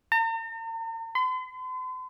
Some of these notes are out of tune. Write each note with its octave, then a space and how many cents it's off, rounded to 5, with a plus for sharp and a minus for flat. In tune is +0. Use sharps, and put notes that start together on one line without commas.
A#5 -45
C6 -45